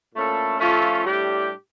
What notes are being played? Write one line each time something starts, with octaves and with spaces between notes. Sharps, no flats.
A#2 A3 C#4 E4 A4
F3 A3 C#4 F4 A4
A2 G3 D4 G4